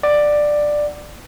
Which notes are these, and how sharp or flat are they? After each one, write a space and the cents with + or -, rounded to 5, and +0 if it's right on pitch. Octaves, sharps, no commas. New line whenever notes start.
D5 +10 F#5 +10